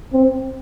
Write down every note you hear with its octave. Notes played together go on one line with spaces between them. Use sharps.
C4